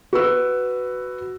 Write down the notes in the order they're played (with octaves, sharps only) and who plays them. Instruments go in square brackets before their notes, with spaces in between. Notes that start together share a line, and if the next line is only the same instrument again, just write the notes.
[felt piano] F#4 B4 E6